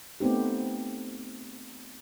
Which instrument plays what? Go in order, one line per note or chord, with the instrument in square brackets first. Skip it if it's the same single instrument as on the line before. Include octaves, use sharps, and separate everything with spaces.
[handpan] A3 B3 C4 D#4 G4